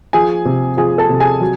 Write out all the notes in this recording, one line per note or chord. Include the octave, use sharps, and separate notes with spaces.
F3 G#4 G#5
C3
F3 G#4 G#5
A4 A5
C3
G#4 G#5
F#3